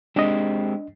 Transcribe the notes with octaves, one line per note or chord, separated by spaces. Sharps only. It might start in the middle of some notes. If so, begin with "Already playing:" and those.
G#3 C4 D4 G4 D#5